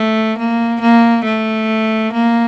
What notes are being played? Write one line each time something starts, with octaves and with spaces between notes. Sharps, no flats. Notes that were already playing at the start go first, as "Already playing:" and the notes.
Already playing: A3
A#3
A#3
A3
A#3